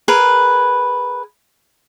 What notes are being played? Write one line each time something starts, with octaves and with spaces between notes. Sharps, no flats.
G#4 A#4 B4